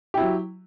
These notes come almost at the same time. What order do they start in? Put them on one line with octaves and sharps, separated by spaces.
G4 E4 F#3